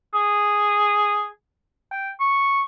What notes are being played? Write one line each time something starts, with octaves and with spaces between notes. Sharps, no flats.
G#4
G5
C#6